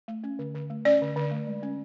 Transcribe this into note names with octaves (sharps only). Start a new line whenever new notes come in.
A3
C#4
D3
D3
A3
C#4 D5
D3
D3
A3
G#3
C#4